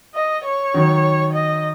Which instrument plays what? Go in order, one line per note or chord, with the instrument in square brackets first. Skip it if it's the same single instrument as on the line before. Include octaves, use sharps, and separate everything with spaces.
[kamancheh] D#5
C#5
[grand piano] D#3 F#3
[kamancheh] D#5